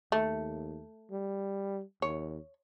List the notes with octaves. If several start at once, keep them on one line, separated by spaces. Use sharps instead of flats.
D#2 A3
G3
D#2 C#5